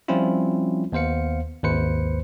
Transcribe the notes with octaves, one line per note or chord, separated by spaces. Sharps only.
F3 G3 C4 C#4 E4 F4
D#2 B3 C5 F5 C#7
G#1 D#2 B4 C5 C#7